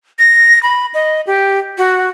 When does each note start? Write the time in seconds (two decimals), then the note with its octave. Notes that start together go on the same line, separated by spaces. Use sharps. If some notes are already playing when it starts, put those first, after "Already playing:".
0.19 A#6
0.63 B5
0.94 D#5
1.27 G4
1.78 F#4